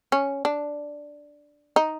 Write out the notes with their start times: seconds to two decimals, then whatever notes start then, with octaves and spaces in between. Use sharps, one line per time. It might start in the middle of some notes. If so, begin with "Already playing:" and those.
0.12 C#4
0.45 D4
1.76 D#4